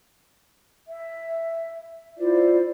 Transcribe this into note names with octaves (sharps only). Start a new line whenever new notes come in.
E5
E4 F4 C5 D5